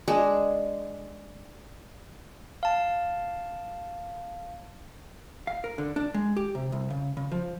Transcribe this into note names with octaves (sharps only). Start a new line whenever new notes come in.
G#3 D4 G#4
F5 A5
F5
A#4
D3
D4
G#3
G4
C3
C2
C#3
C#3
F3